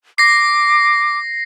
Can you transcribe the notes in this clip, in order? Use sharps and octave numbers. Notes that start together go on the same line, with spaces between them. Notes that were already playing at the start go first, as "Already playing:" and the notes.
D6 A#6 C7